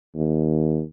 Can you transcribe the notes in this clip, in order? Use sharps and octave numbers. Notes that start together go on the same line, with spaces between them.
D#2